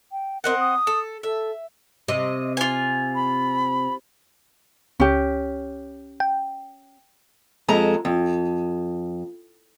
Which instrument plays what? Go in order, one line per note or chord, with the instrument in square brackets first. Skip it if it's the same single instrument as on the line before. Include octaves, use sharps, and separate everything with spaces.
[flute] G5
[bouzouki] C4 D#5 F#5 [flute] A#4
[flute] D#6
[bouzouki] A4
[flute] A4 [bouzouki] E5
[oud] C3 [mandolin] D#5
[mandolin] F4 G#5
[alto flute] B5
[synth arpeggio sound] C#2 [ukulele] C#4 G4
[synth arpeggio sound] G5
[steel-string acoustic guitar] F2 G#3 A4 A#5
F2